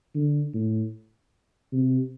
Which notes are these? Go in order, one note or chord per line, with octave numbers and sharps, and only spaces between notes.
D3
A2
C3